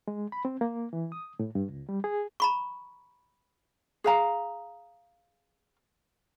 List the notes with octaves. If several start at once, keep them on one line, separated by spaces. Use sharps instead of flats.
G#3
B5
C4
A#3
E3
D#6
A2
G2
C#2
G3
G#4
A#5 B5 C#6
G#4 F5 A#5